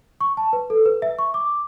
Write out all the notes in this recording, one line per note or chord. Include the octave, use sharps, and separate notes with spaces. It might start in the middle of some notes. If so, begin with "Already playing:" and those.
C#6
A5
B4
A4
B4
E5
C#6
D6